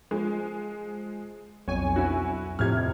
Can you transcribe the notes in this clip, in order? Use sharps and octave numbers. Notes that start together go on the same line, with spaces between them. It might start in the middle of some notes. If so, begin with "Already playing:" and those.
F3 G#3
B1 F2 C#5 G#5
C#4 E4 F#4
F2 A2 C3 F6 G#6